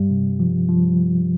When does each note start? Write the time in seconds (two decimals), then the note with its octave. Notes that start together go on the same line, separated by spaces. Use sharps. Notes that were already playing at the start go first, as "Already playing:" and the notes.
Already playing: G2 G3
0.10 C3
0.40 F3
0.69 F3